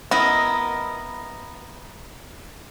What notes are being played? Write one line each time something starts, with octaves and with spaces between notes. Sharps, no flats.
B3 E4 A#4 D#5